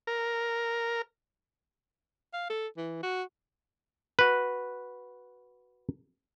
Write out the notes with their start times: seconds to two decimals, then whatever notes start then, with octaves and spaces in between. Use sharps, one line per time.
0.07 A#4
2.33 F5
2.50 A4
2.77 E3
3.03 F#4
4.19 F#4 B4